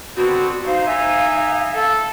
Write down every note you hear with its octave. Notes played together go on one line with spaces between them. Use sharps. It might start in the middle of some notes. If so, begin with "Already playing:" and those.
D3 B3 C4 F#4
D#4 C5 F5
D#4 E5 G#5
A4